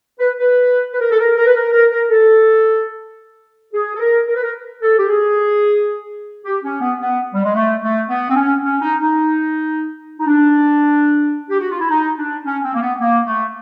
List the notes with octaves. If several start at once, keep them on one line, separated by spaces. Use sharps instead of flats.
B4
B4
B4
A#4
A4
A#4
A#4
B4
A#4
A#4
A#4
A4
G#4
A4
A#4
A#4
B4
A#4
A4
G4
G#4
G4
C#4
B3
B3
G3
G#3
A3
A3
B3
C4
C#4
C#4
D#4
D#4
D#4
D4
G4
F#4
F4
E4
D#4
D4
C#4
C4
A#3
B3
A#3
A3